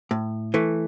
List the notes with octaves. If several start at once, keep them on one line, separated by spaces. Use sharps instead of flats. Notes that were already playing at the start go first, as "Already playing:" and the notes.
A2
E3 A3